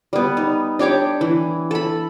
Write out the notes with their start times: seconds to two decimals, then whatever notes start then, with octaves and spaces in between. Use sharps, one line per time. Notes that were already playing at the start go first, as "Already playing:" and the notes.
0.13 G3 B3
0.37 D#4
0.79 D4 G4 C#5 D6
1.21 E3
1.71 A4 B5